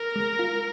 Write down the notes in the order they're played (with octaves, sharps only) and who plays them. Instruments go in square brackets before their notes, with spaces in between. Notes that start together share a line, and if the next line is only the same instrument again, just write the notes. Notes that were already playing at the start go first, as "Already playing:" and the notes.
Already playing: [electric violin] A#4
[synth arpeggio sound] G#3
F4